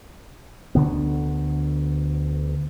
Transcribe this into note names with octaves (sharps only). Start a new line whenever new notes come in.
D2 D3 B3